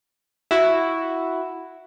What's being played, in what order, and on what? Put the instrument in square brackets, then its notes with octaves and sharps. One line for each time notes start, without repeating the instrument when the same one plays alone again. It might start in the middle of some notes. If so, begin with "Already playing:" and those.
[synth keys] E4 F#4